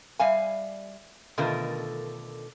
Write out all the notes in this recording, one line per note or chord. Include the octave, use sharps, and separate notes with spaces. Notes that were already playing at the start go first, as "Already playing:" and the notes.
G3 E5 F5 G#5
B2 D3 D#3 A3 F4 A#4